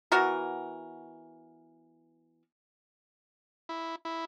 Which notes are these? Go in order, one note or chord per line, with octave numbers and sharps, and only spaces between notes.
E3 B3 F#4 A#4
E4
E4